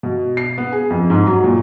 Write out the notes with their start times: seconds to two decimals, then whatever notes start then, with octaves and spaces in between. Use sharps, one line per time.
0.03 B2
0.37 C7
0.58 B3
0.73 G#4
0.90 F2
1.10 G#2
1.27 F#3
1.44 A#2